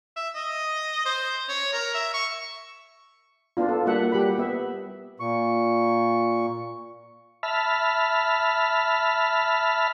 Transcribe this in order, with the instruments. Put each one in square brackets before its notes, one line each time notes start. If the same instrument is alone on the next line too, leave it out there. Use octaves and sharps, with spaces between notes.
[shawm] E5
D#5
C5
C#5
A#4
E5
C#6
[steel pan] B3 D4 F4
A4
G3 A#3 D4 F#4 E5 F#5
G3 G4 F#5 B5
B3 E5
[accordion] A#2 C#6
[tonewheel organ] E5 A5 B5 F6